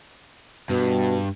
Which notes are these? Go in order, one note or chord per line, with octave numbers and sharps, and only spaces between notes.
G2 B2